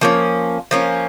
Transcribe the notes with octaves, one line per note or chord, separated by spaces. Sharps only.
F3 A#3 C#4
F3 A#3 C#4